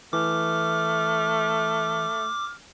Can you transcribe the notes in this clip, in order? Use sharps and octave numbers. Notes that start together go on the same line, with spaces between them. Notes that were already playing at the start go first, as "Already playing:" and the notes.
E3 A3 D6 F6